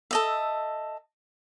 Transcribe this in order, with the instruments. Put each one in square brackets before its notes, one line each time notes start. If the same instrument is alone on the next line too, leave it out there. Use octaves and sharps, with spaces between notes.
[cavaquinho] A4 D#5 E5